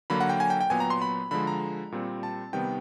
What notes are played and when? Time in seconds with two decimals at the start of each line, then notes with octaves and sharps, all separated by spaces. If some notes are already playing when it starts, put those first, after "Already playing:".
0.10 D3 F#3 A#3 B5
0.20 F#5
0.29 G5
0.40 G#5
0.50 G5
0.61 G5
0.70 A#2 F#3 B3 G#5
0.80 A#5
0.90 C6
1.02 B5
1.31 D3 F3 G#3 B5
1.47 A#5
1.92 A#2 G3 C4
2.23 A5
2.53 C3 D#3 G3 B3 G5